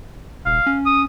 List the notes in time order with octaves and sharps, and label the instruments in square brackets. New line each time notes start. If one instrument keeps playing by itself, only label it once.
[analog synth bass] D#1 [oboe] F5
[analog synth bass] C#4
[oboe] D#6